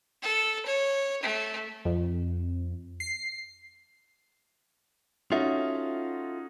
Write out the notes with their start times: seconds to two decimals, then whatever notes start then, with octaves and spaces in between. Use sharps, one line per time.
0.23 A4
0.66 C#5
1.22 A3
1.85 F2
3.00 C7
5.32 C#4 D#4 F4 F#4 A4 E5